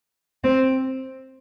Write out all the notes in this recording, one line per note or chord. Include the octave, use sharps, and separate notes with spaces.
C4